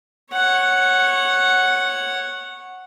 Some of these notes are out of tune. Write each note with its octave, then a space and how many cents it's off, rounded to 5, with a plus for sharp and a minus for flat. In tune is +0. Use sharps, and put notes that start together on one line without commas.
C#5 -15 F#5 +0